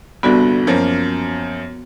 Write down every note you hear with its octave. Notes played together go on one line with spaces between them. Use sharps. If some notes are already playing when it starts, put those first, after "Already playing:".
G1 C2 D3 B3 F#4
F#2 F3 A#3